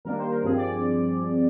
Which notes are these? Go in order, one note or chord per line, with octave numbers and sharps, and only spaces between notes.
D#3 G3 A#3 D4 A#4
C5
A#4
G2 F3 C4 G#4
D5